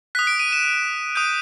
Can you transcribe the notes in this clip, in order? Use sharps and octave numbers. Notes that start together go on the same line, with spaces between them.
D#6 F#6 B6
D7
D#7
E7
D#6 G6 D#7